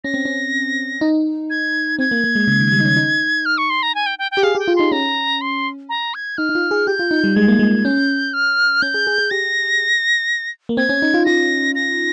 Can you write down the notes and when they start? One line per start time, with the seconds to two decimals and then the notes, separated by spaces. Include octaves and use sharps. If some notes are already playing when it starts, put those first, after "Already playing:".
0.04 C#4 A#6
0.14 C4
0.25 C#4
1.01 D#4
1.50 G#6
1.99 C4 G#6
2.11 A#3
2.24 A#3
2.35 G#3
2.48 C#3
2.60 D#3
2.72 G3
2.80 D#4
2.85 C#4
2.97 D#4
3.46 F6
3.58 C#6
3.70 C6
3.83 A#5
3.95 G#5
4.06 G5
4.19 G5
4.31 G5
4.37 G4
4.43 G#4 F5
4.55 G4
4.59 G5
4.68 F4
4.76 D#4 C6
4.92 C#4 A#5
5.41 C6
5.89 A#5
6.14 G#6
6.38 D#4 F6
6.49 D#4
6.55 F4
6.71 G#4
6.87 G4 G6
6.99 F4
7.11 D#4
7.24 G3
7.36 G#3 G#6
7.48 A#3
7.59 G#3
7.85 C#4 G6
8.34 F6
8.82 C#4 G6
8.94 G#4
9.07 G#4
9.18 G#4
9.31 G4 A#6
10.69 A#3
10.77 C4 G#6
10.89 C#4
11.02 D#4
11.14 F4
11.26 F4 A#6
11.75 A#6